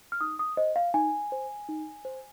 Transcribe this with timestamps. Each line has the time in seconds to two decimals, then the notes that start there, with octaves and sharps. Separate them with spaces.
0.12 F6
0.21 D#4 D#6
0.39 D#6
0.57 C5 D#5
0.76 F5
0.94 D#4 G#5
1.32 C5
1.69 D#4
2.05 C5